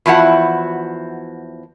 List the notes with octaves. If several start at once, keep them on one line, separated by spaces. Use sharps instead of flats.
E2 F3 E4 F#4 F#5